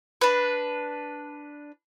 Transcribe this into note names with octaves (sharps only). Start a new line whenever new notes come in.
D4 B4